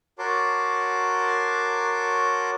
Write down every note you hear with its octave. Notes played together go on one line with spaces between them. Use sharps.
F#4 A#4 C#5 A5 C6 D6